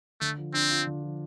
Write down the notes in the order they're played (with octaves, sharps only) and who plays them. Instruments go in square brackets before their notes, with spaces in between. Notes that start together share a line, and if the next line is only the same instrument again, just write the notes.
[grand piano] D3 [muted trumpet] A3
[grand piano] F3
[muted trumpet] C4 [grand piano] D4
[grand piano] F4
D3
F3